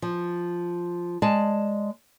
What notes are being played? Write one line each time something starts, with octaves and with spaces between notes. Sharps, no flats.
F3
G#3 D5 A5